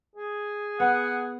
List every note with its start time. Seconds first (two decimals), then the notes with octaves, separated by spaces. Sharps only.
0.15 G#4
0.80 B3 F#5